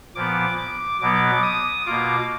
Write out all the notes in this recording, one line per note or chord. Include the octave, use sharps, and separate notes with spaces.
A#2 F3 B3 D6
D6
B2 F#3 B3 D6
D#6
B2 A#3 F4 D6